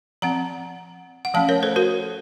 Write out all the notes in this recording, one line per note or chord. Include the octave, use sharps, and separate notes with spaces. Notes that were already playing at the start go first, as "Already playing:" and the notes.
F3 C4 F#5 A#5
F#5
F3 A3 C#4 F5 A5
A#4 C#5
A4 C5
F#4 A#4